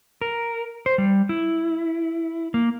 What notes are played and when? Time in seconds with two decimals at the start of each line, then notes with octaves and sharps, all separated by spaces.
0.22 A#4
0.86 C5
0.98 G3
1.29 E4
2.54 A#3